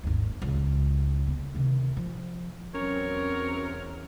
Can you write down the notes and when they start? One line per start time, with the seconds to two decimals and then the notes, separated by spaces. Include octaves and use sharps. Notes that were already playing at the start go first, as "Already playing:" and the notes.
0.03 G#1 D#2
0.42 C#2
1.26 D3 B3
1.55 C3 D#3
1.97 F3
2.75 E2 F#3 C4 C#4 A#4 C#5